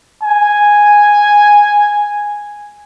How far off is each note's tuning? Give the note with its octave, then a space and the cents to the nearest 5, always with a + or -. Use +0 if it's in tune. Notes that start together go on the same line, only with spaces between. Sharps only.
G#5 -5